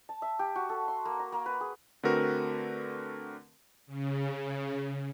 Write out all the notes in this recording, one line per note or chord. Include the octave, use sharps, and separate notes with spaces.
A5
E5
G4
F#4
A4
C6
A#3
A#5
A#3
B4
G#4
D3 A3 C4 F#4 A#4 B4
C#3